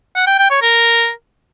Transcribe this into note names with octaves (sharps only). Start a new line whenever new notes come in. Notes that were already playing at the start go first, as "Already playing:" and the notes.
F#5
G5
G5
C#5
A#4